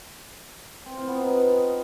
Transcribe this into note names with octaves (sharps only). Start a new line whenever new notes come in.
C4
F4
B3
D#4